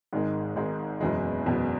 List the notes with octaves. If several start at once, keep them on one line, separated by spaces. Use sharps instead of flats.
G#1 G#2 D#3 G#3
G#1 G#2 D#3 G#3
F#1 E2 B2 G#3
F#1 E2 B2 G#3